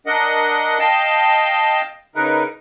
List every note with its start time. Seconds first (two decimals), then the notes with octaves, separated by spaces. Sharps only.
0.06 D4 A#4 D#5 F#5
0.79 D#5 F5 G5 A5
2.15 C#3 D#4 A#4 B4